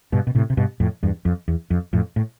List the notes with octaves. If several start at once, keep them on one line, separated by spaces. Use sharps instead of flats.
G2 B2
B2
A2 C3
C3
G2 B2
F2 A2
E2 G2
F2
E2
F2
F2 A2
A2